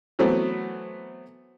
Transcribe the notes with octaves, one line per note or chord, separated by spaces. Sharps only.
E3 F#3 A3 B3 C4